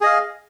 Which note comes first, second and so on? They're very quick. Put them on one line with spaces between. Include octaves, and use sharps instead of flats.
G#4 D#5 F5